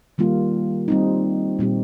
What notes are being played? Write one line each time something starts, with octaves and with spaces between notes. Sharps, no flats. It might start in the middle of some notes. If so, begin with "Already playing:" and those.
D#3 G3 A#3 F4
G3 C4 D#4
A#2 G3 C4 G4